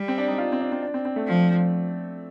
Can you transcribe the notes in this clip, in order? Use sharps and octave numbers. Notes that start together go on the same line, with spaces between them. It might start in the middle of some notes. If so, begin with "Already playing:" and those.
Already playing: G3
C4
D4
D#4
F4
C4
D4
C4
D4
C4
C4
A3
F3